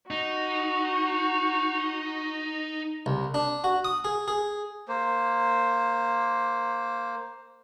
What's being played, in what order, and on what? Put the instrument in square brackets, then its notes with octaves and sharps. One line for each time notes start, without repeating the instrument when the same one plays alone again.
[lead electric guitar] D#4 [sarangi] F#4
[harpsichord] C2
D4
F#4
D#6
G#4
G#4
[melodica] A#3 C5